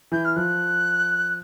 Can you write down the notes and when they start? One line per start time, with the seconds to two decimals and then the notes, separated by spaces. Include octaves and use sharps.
0.12 E3 G6
0.25 F6
0.36 F3 F#6